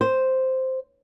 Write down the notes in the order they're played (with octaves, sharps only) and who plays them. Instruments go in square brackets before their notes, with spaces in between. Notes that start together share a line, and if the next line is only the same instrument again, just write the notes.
[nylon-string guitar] C5